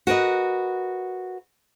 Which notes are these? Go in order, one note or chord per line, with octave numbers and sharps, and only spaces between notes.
F#4 A#4 B4 D#5